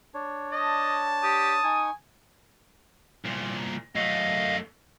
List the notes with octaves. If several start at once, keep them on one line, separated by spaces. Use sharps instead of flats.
D4 C#5
D#5 A5
G4 D#6
D#4 G#5 C#6
C2 A#2
F#2 A3 D#5 F5